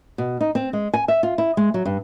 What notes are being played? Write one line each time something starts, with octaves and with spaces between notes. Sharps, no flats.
B2
D#4
C4
G#3
G#5
E5
F4
E4
G#3
F#3
G2